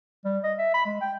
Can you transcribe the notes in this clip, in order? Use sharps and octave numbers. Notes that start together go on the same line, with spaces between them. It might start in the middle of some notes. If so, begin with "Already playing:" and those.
G3
D#5
E5
B5
G#3
G5